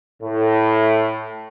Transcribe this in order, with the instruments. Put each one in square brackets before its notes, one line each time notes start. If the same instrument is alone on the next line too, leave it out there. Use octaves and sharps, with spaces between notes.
[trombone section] A2